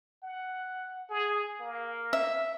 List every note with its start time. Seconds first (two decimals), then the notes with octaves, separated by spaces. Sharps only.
0.23 F#5
1.10 G#4
1.61 A#3
2.13 E5